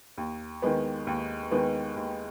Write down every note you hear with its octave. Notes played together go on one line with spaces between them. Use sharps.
D#2
D#3 G#3 B3
D#2
D#3 G#3 B3
D#2